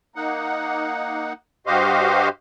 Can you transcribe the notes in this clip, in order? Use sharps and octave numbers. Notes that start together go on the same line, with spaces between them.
A#3 D#4 F#5
G2 F#4 G4 C5 D#5 F5